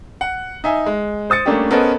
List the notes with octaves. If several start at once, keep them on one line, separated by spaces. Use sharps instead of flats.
F#5
D#4 E5 G#5
G#3
C5 D#6 A6 C#7
G3 A3 A#3 C#4 D4 G4
B3 C#4 A4 A#4 C5 D#5